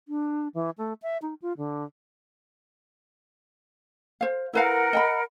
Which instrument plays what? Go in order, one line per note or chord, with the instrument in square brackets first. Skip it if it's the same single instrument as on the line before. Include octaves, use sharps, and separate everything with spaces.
[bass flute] D4
E3
A3
E5
D#4
F4
D3
[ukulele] C5 F5
[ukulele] E4 B4 F5 [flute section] A#4 F#5
[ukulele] D#5 G5 B5